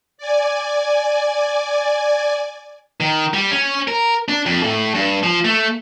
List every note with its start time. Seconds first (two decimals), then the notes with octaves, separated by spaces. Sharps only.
0.18 D5 G#5
3.00 D#3
3.34 G3
3.51 C#4
3.88 A#4
4.28 D4
4.46 F2
4.63 A2
4.94 G2
5.23 F3
5.44 A3